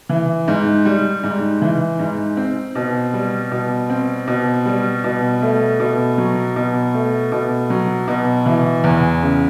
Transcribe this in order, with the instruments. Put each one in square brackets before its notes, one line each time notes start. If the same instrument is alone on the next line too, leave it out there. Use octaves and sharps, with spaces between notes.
[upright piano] E3
G#2
G3
G#2
E3
G#2
C4
B2
G3
B2
C4
B2
G3
B2
A3
B2
F#3
B2
A3
B2
F#3
B2
E3
E2
C#3